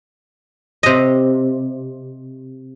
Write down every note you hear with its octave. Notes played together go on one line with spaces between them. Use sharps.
C3 D#5